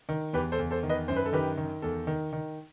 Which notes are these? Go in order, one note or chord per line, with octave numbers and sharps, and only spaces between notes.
D#3
E2 G4 B4
A4 C5
E2
A4 C5
D#3
B4 D#5
F#2 C5
B4
A4
D#3 G4 B4
D#3
E2 A4
D#3
D#3